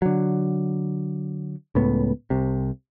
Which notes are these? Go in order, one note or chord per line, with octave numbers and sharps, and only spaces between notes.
D3 F#3
C#2 A2 B3
C2 C3